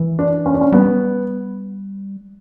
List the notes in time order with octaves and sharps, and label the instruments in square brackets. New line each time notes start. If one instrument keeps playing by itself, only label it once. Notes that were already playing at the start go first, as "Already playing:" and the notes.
Already playing: [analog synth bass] E3
[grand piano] D4
C#4
D4
C#4
[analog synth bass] G3 [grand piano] B3